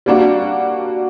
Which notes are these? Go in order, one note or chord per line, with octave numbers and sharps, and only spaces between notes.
G3 A#3 D4 F#4